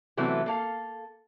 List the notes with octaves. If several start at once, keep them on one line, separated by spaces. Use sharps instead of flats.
C3 E3 F#3 A3 B3
A#3 A4 F5